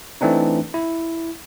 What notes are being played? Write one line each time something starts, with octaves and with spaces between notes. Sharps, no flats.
E3 A3 C4 D4 D#4
E4